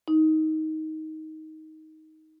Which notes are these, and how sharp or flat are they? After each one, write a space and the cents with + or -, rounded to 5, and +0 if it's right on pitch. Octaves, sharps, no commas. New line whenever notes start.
D#4 +15